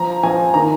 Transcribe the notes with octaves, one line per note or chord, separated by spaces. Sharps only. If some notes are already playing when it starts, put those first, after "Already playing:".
Already playing: F3 A#5
F3 G#5
D#3 A#5